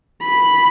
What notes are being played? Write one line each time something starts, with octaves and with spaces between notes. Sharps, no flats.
B5